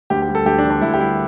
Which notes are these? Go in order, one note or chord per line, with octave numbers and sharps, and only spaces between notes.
D2 G4
G4
G3
A4
D2 G4
D4
D3
D4
D2 E4
G4
G3 E4